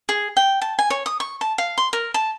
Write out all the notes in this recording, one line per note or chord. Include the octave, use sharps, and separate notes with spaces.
G#4
G5
A5
G#5
C#5
D#6
C#6
A5
F5
C6
A#4
A5